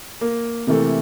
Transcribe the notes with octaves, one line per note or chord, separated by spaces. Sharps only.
A#3
C3 E3 A3 A#3